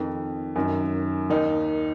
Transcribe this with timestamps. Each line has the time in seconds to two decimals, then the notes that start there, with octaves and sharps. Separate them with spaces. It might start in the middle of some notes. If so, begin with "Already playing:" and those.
Already playing: F2 D#3
0.56 F#2 D#3
1.30 D#2 D#3 D#4